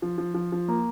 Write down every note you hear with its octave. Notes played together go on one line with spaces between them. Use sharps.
F3
F3
F3
F3
A#3